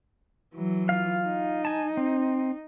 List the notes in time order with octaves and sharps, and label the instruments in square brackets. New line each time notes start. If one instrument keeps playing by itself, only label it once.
[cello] E3 F#3
[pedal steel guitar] F4 F5
[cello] D#4
[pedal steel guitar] G#5 A5
C4